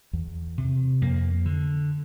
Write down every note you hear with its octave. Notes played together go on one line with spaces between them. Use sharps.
E2
C3
F2 A#3
D3